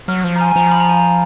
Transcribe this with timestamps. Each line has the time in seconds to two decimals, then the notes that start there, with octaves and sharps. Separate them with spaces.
0.08 F#3 F6
0.24 F3
0.36 A#5
0.41 G#5
0.51 G#5
0.56 F3 A#5
0.71 B5
0.80 A#5
0.89 G#5
0.97 A#5